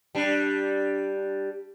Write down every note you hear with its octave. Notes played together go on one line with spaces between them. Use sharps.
G3 D4